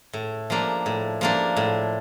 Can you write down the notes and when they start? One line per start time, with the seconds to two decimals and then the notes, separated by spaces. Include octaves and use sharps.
0.13 A2
0.50 F3 A#3 D4
0.86 A2
1.21 F3 A#3 D4
1.57 A2